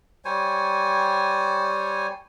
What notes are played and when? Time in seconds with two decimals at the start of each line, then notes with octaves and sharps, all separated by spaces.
0.25 G3 C5 C#5 G#5